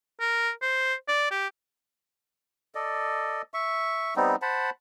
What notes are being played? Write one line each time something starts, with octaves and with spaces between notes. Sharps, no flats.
A#4
C5
D5
G4
A4 D5 D#5
E5 C#6
G3 B3 C4 D#4
C5 F#5 A5 B5